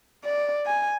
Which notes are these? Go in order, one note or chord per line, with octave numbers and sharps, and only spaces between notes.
D5
G#5